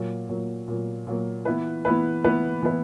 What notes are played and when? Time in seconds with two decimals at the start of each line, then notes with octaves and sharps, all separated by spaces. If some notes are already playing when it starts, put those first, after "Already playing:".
Already playing: A#2 F#3 A#3
0.29 A#2 F#3 A#3
0.68 A#2 F#3 A#3
1.07 A#2 F#3 A#3
1.45 E3 B3 E4 B4
1.85 E3 B3 E4 B4
2.24 E3 B3 E4 B4
2.63 E3 B3 E4 B4